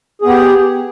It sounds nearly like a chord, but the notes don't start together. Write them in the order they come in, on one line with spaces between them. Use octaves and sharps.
G#4 B3 G4